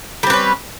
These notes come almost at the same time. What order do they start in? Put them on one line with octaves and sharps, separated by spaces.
G3 C4 B4 C#4